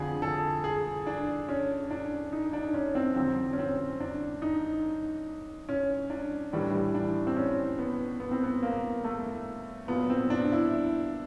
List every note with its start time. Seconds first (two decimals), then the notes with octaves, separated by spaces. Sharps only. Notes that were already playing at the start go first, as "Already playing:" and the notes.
Already playing: F2 D3 F3 G#4
0.22 A4
0.64 G#4
1.07 D4
1.49 C#4
1.91 D4
2.33 D#4
2.53 D4
2.74 C#4
2.95 C4
3.16 F2 D3 F#3 C4
3.53 C#4
3.59 C4
4.00 D4
4.42 D#4
5.69 C#4
6.10 D4
6.53 A2 E3 G3 D4
6.95 D4
7.27 C4
7.37 C#4
7.79 B3
8.20 B3
8.31 C4
8.44 B3
8.63 A#3
9.04 A3
9.88 A#2 F#3 B3
10.10 C4
10.30 D4
10.52 E4